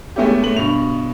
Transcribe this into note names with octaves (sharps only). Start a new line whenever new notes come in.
G#3 A3 B3 C#4 E4 G4
A3 F#7
G2 B2 F7